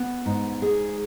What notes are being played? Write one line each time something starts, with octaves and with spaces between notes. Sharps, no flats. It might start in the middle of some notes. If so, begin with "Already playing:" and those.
Already playing: B3
G#2
G#4